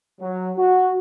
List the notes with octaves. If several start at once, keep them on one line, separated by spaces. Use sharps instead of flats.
F#3
F#4